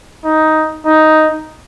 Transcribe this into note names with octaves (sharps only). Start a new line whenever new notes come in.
D#4
D#4